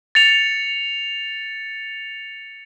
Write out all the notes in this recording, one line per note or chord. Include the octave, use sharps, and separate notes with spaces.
A6 C#7 F7